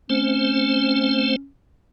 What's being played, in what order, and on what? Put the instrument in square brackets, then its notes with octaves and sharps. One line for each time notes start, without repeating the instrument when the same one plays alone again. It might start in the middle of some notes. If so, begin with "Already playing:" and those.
[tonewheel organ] A3 C4 C5 [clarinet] C#4